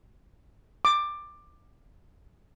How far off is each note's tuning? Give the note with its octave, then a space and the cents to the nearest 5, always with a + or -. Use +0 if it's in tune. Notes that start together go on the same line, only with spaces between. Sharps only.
D6 +15